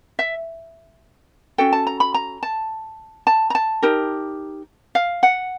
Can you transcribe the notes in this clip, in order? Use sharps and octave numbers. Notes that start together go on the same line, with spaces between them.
E5
C#4 F#4 A4 G5
A5
A#5
B5
A#5
A5
A5
A#5
A5
D#4 G4 A#4
F5
F#5